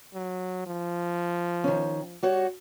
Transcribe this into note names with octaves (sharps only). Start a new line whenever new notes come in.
F#3
F3
D#3 C#4
G3 F#4 C#5